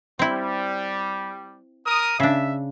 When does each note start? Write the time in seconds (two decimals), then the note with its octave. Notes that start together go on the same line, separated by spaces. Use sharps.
0.19 G3 C4 E4
1.86 A#4 D#6
2.20 C#3 D4 E5